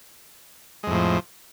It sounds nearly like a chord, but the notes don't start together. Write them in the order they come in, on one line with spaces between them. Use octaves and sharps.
G#3 F2 A2 F3